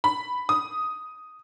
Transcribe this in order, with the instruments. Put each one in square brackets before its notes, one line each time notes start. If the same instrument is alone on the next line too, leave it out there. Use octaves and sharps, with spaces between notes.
[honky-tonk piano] B5
D#6